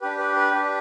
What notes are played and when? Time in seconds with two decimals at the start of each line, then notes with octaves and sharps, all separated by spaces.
0.01 D4 G4 B4
0.19 B4
0.36 B4
0.53 D4 G4